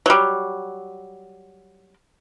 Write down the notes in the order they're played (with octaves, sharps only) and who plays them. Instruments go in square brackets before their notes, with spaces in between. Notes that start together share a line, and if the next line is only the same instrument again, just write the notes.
[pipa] F#3 G3